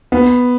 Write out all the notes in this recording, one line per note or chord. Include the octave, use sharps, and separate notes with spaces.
B3